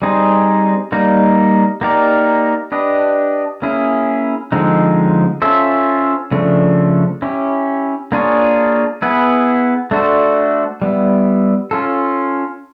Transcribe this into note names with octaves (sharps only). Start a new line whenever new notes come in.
G3 C4 D#4 G#4 C5
G3 A#3 D#4
A#3 D#4 G4 A#4 D5
D4 G4 B4 D#5
A#3 C#4 E4 G#4
D3 F3 G#3 C4 D#4
C#4 F4 A4 C5 E5
C#3 F3 A3 D4
C#4 E4 G4
A#3 D4 F4 G#4 C#5
B3 E4 G#4 B4
A3 D4 F#4 A4 C5
G3 B3 E4
C#4 F4 A4